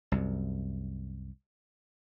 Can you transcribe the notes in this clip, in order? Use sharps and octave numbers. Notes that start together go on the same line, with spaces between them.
C2 F#2